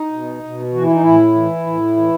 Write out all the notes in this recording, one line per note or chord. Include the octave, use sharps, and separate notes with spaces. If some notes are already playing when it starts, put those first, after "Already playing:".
Already playing: D#4
B2
B2
E3 F#4
E4
D#4
A2 E4
E3
A2
E3